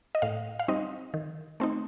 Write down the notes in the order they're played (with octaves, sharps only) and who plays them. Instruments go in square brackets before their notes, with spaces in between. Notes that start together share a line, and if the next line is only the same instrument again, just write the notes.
[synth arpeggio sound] D#5
A2 F5
F5
G3 C4 D#4 D#5
D#3
A3 C4 D#4